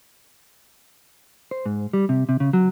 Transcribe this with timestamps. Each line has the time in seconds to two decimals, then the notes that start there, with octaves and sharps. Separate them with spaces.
1.51 C5
1.66 G#2
1.93 G3
2.09 C3
2.29 C3
2.40 C#3
2.53 F#3